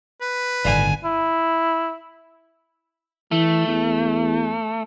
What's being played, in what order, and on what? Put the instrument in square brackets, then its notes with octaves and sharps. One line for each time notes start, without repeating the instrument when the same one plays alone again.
[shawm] B4
[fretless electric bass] G1 A2 D#3 [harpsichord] D3 F5 [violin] G#5
[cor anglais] E4
[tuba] E3 [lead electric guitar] A3
[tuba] E2